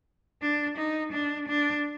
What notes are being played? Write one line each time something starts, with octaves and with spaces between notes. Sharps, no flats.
D4
D#4
D4
D4